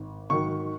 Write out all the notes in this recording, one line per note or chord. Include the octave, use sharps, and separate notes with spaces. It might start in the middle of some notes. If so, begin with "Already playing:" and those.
Already playing: G#1
G#2 D#3 F#3 C#6